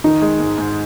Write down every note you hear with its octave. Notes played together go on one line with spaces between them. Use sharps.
D#3 D#4
G#3
G#2
G#2